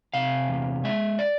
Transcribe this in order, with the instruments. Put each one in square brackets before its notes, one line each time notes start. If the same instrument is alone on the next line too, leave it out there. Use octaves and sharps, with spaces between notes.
[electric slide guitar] C3 F5
E2
G#3 E5
D5